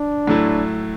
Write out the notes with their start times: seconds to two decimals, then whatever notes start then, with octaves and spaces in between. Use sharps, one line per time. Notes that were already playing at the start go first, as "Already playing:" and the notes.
Already playing: D4
0.27 A2 F#3 A3 E4